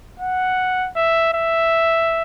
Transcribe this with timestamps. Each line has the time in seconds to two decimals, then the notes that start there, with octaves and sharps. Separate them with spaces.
0.20 F#5
0.96 E5
1.34 E5